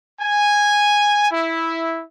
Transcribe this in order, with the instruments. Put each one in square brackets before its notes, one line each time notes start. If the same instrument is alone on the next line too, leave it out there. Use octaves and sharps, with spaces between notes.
[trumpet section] G#5
E4